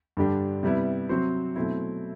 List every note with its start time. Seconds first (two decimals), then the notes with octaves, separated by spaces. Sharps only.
0.17 G2 D3 G3 D4 G4
0.63 C3 G3 B3 E4
1.09 C3 F#3 C4 F#4 C5
1.56 B2 F#3 A3 C4 E4